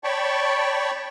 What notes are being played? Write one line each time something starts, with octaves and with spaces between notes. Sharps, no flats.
C#5 D5 G5 A5 B5 C#6